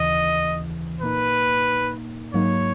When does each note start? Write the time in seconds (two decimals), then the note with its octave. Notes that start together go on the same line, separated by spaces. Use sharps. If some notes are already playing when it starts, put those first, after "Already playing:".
Already playing: D#2 C#3 E3 D#5
1.01 A#2 A#3 D#4 B4
2.33 G#2 F#3 A#3 D#4 C#5